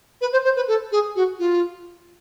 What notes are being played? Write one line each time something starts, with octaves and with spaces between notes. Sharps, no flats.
B4
C5
C5
B4
A4
G#4
F#4
F4